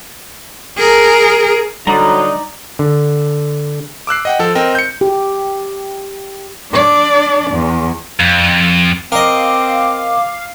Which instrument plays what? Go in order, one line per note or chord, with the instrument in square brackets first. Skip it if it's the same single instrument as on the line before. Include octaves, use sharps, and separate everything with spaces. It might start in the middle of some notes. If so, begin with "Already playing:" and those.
[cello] G#4 A#4
[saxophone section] D3 F#3 [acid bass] G3 [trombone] D#4 [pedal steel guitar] D5 A#5
[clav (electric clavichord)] D3
[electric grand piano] D6 E6 F#6 C7
D#5 F#5 G5
F3 A4
C4 A#4 D#5 G5
G6 C#7
[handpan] G4
[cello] D4 D5
E2
[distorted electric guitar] F2
[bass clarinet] C4 [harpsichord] A#4 D#5 [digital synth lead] F5 [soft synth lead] D6